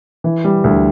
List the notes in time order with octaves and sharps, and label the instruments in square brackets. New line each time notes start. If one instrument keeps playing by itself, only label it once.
[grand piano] E3
G3
D2